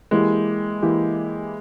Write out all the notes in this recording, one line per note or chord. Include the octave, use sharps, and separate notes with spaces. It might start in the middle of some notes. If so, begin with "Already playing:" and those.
E3 G#3 A#3 E4 G4
E3 A#3 E4 G4